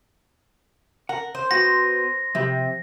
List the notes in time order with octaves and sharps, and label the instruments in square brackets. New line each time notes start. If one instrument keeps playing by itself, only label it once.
[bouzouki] A#4 [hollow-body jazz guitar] F#5
[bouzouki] C5
[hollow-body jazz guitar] B3 F#4 F#5 [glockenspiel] A#6
[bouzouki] C3 [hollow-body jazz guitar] F3 G4 B5